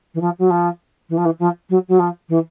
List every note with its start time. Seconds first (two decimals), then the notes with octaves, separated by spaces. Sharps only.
0.14 E3
0.21 F3
0.39 F#3
0.50 F3
1.09 E3
1.17 F3
1.25 E3
1.39 F3
1.70 F#3
1.88 F#3
1.99 F3
2.29 E3